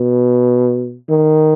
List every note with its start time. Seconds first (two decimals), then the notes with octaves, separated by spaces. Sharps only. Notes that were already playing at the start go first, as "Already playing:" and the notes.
Already playing: B2
1.09 D#3